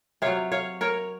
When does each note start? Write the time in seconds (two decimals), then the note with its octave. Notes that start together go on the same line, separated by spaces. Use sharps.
0.22 C3 F#3 C#5 F5
0.52 C#5 F5
0.81 A#4 C#5